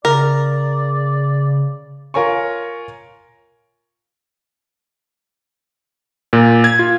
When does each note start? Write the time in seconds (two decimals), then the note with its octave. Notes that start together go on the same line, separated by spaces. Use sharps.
0.05 C#3 A#4 D5
2.14 F4 A#4 C#5 G#5 C#6
6.33 A#2
6.64 G#6
6.79 F4